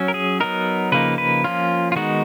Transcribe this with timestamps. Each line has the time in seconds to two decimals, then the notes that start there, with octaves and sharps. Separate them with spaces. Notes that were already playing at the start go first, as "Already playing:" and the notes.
Already playing: F#3 C#4
0.08 A#4
0.14 G#4
0.40 F#3 B3 D#4 A#4
0.92 C#3 F3 A#3 D#4 B4
1.18 B4
1.44 F3 A#3 C#4 F4
1.92 F4
1.96 D#3 G#3 B3 D#4 F#4